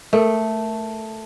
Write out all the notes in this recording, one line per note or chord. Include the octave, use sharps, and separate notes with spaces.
A3 A4 A#4